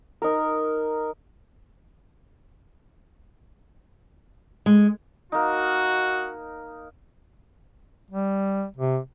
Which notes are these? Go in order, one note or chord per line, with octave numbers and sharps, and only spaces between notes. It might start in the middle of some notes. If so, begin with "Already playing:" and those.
D#4 A#4
G#3
A#3 D#4 F#4
G3
C3